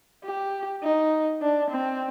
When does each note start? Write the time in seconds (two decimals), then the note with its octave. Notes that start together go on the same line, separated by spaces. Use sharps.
0.24 G4
0.83 D#4
1.42 D4
1.71 C4